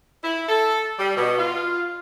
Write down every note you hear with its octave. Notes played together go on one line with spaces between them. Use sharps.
E4
A4
G3
B2
F4